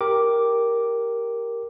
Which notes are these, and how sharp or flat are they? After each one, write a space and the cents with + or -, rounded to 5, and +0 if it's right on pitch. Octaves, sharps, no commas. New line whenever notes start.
G4 +0 A#4 +0 D6 +0